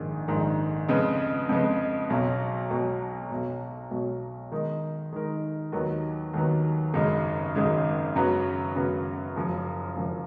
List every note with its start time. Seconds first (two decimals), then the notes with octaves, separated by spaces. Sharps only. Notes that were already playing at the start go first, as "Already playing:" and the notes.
Already playing: A#1 G#2 D#3
0.28 A#1 G#2 D#3
0.88 F2 C#3 G#3 B3
1.49 F2 C#3 G#3 B3
2.10 B1 B2 F#3
2.70 B1 B2 F#3
3.30 B1 B2 F#3
3.91 B1 B2 F#3
4.52 D#3 G#3 D#4 A#4
5.12 D#3 G#3 D#4 A#4
5.72 D#2 D#3 F#3 B3
6.33 D#2 D#3 F#3 B3
6.94 G#1 F#2 C#3 G#3 D#4
7.55 G#1 F#2 C#3 G#3 D#4
8.15 F#2 C#3 F#3 B3
8.75 F#2 C#3 F#3 B3
9.36 F#1 F#2 F3
9.96 F#1 F#2 F3